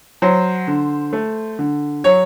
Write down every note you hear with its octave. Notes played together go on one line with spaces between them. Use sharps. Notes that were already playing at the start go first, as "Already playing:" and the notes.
F#3 C5
D3
A3
D3
F#3 C#5